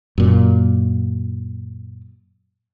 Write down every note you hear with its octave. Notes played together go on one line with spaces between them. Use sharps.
F#2 A#2